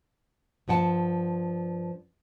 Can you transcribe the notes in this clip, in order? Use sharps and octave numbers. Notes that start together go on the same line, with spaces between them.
G2 F3 F#5 G5 A5